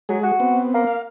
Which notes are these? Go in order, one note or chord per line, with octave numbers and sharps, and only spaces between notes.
F#3 G#3 G#4
F#4
B3 C4
A#3
F5